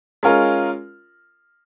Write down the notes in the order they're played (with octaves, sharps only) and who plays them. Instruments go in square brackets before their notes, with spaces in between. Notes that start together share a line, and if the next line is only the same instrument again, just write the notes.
[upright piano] G#3 C#4 F4 A#4